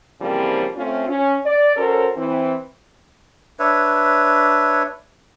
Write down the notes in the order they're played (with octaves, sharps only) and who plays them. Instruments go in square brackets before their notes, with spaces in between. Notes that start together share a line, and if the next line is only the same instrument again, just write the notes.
[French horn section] C#3 E3 F3 G3 A#3 C4
A3 C4 C#4 F4
C#4
D5
C#4 F#4 A4 A#4 C5 C#5
E3 C4
[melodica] D4 B4 C#5 E5